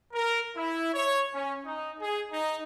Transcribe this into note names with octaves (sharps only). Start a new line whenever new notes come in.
A#4
E4
C#5
C#4
D#4
G#4
D#4